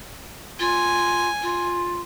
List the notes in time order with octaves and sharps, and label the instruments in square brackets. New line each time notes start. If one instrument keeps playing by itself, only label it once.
[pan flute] F4 [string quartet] G#5
[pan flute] F4